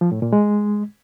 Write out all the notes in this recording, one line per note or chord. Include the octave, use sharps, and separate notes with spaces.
F3
A2
A#2
G#3